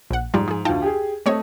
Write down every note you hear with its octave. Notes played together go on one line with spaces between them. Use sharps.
A#1 F#5
G#2 F3 G3
F3 G#4
D2 D#4 F4 G5 A5
G4 G#4
A3 C4 C#5 D#5